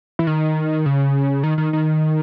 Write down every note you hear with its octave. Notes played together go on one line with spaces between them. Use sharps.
E3
D#3
C#3
D#3
D#3
D#3